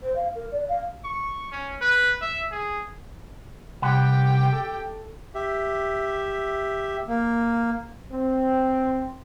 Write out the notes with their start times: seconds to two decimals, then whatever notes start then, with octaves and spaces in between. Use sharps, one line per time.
0.02 C5
0.16 F5
0.34 A#4
0.51 D5
0.68 F5
1.05 C#6
1.52 C#4
1.81 B4
2.21 E5
2.52 G#4
3.82 C2 G4 F#5 G5 B5
4.53 A4
5.35 G4 E5
7.08 A#3
8.12 C4